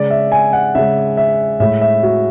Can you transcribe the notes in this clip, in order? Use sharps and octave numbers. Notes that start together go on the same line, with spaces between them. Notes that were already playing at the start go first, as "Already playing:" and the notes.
Already playing: C#3 G#3 D5
E5
G#5
F#5
C#3 G#3 E5
E5
A2 G#3 E5
E5
F#4